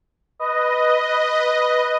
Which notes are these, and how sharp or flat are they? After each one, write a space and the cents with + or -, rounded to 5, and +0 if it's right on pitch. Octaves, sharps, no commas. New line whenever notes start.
B4 +0 D#5 +0